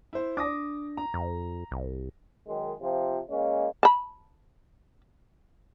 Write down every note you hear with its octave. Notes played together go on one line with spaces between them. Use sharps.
E4 C5
D4 D6 D#6 A#6
A#5
F2
C2
F#2 D#3 G#3
C3 F3
G#3 A#3 C#4
A5 B5